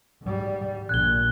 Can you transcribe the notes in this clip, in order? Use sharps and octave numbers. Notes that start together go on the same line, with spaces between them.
G#2 G3
A#1 A#2 F#6 G#6 G7